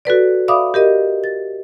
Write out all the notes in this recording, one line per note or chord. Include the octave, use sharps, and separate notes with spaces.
F#4 A4 B4 D5
D5 E5 F5 B5 D6 D#6
G4 A#4 D#5
A6